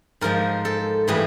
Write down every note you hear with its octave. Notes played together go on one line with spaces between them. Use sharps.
G#2 F3 G#3 A#4
A4
A2 E3 G3 G#4